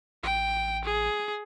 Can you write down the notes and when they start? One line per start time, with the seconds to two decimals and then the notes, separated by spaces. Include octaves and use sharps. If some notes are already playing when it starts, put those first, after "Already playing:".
0.23 A1 G5
0.85 G#4